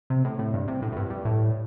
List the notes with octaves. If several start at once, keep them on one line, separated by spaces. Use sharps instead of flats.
C3
A2
A2
G2
C3
A2
A2
G2
G2
A2